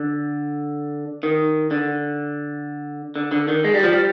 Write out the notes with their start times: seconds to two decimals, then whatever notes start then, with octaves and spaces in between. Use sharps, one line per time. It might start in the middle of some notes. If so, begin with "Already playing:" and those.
Already playing: D3
1.23 D#3
1.71 D3
3.16 D3
3.32 D3
3.48 D#3
3.64 G#3
3.74 G3
3.83 F3
3.93 G3